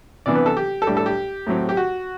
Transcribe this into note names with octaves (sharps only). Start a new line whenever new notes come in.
C3 E3 B3 D4 D5
B4
A4
G4
A4
A2 G3 D4 G4
A4
G4
A2 F#3 C4
G4
F#4